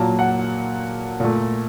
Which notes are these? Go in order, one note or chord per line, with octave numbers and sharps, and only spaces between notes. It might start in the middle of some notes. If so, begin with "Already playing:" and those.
Already playing: A#2 F#3 A#3 A5
F#5
A#2 A3